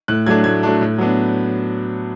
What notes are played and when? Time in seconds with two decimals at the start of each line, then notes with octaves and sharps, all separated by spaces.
0.08 A2 F#6
0.27 F#3 A3 D4 G#6
0.44 A2 G#6
0.63 F#3 A3 D4
0.81 A2
0.98 F#3 B3 D4